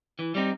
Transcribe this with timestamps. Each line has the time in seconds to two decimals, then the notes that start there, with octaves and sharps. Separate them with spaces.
0.19 E3
0.35 G3 C4 D#4